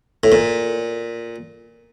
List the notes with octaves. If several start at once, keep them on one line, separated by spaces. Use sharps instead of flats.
A2
A#2